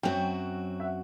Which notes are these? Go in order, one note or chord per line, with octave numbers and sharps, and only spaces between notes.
F#2 F#3 C4 F#4 G5
E5
F#5